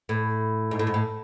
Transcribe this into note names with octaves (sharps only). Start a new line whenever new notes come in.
A2
G#2
A2
G#2
A2